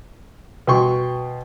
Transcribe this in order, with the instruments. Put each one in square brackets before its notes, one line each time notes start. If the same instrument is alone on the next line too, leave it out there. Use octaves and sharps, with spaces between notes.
[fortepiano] B2 G5 C6 C#6